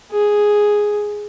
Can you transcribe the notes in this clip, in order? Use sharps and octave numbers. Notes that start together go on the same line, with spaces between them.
G#4